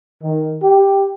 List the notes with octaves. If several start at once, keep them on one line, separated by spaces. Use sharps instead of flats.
D#3
G4